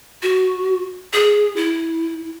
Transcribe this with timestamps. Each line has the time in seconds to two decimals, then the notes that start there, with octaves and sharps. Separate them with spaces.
0.22 F#4
1.13 G#4
1.56 E4